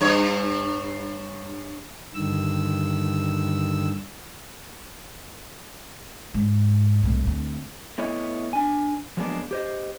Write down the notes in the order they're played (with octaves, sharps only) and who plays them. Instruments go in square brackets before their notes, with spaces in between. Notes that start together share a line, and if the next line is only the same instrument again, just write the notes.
[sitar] G2 C#5
[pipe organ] G2 D3 D#3 E6
[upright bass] G#2
C2 A2
D2 C4
[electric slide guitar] A3 B3 E4 C#5 D#5
D4 G#5
F3 F#3 G#3 A#3 B3 D4
G4 C5 D#5